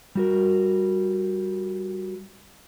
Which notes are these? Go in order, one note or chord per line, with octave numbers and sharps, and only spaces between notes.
G3 F#4 A#4